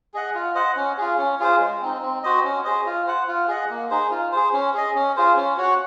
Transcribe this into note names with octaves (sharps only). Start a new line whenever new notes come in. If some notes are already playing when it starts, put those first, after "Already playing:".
G#4 D#5 F#5
F4
C5 D#5 F#5
C#4
F4 G#4
C#4
F4 G#4 C5
G#3
C4 D#4
C4
F#4 C5 D#5
C#4
G#4 C5 D#5
F4
C5 F#5
F4
G#4 D#5 F#5
A#3
D#4 G#4 C5
F4
G#4 C5
C#4
G#4 D#5
C#4
F4 G#4 C5
C#4
F#4 C#5 F#5